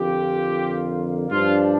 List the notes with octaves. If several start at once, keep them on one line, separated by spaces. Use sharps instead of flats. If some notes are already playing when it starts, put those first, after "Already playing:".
Already playing: F2 D3 A#3 F4 G4
G2 F3 D4 F4